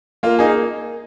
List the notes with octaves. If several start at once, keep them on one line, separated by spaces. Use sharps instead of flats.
A#3 F4
D#4 G#4